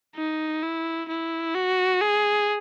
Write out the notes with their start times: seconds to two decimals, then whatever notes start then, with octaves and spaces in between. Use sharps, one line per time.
0.16 D#4
0.63 E4
1.09 E4
1.55 F#4
2.01 G#4